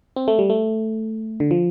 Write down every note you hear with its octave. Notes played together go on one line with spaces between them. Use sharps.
C4
A3
G3
A3
D3
F3